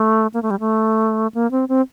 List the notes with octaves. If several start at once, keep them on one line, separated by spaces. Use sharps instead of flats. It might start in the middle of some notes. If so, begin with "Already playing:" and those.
Already playing: A3
A#3
A3
G3
A3
A#3
C4
C4